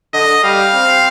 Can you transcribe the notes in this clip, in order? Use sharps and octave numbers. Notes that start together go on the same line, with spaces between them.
D3 D#5
G3 F5
C4